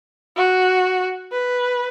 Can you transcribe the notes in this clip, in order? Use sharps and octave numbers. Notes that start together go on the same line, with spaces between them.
F#4
B4